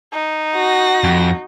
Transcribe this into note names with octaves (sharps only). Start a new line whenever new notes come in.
D#4
F#4 A#6
F2